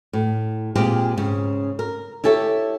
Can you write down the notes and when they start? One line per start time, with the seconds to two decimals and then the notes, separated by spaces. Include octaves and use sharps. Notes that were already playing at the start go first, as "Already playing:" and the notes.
0.13 A2
0.75 A#2 G#3 C4 F4 G4
1.17 G#2 C#3
1.79 A#4
2.24 E4 G4 A4 C#5 E5